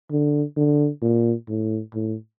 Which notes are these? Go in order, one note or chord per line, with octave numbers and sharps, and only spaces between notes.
D3
D3
A#2
A2
A2